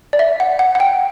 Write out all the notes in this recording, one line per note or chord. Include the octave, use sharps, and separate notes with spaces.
D5
E5
F#5
F#5
F#5
G5